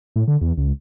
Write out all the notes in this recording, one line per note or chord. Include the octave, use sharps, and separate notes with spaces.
A2
D3
E2
C#2